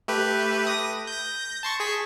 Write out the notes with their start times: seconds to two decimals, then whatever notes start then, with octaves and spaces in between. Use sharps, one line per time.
0.08 A3 G4 B4
0.67 D#6 A#6
1.07 G6 A#6
1.63 A5 C6 C#6
1.80 G#4 C#6 B6